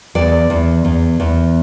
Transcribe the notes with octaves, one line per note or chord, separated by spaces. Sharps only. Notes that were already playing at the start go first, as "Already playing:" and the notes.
E2 D5
E2
E2
E2